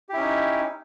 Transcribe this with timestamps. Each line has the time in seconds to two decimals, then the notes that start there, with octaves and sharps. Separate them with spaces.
0.09 G4
0.13 E4
0.17 C#4
0.21 D#4